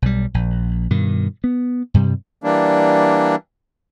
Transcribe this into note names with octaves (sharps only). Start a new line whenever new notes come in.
B1 G3
A#1
G2 B2 D#3
B3
G2 C3 G3
E3 G3 A#3 D4